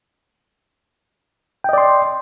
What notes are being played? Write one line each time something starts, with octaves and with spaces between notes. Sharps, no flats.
D5 D#5 G5 C6